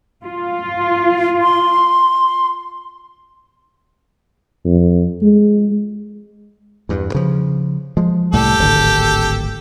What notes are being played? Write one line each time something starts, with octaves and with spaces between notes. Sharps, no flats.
F4
C6
F2
G#3
E2 G2
C#3 F3
F3 G#3
C2 A2 G3 G4 A4
D1 G#1 D3